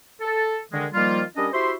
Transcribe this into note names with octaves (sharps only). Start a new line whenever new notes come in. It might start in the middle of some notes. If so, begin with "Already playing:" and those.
A4
D3 D#3 G#3
D#3 F3 G3 A#3 F4
G3 C#4 D4 A#4 D#5
E4 F#4 G4 C5 E5 C6